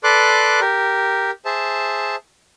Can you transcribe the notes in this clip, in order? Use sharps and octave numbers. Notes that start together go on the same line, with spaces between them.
A4 B4 D5 C6 D6 F#6
G4 A#4
G#4 C5 E5 A5